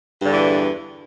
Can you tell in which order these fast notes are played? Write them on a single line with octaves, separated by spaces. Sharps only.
G2 D3 E2 E3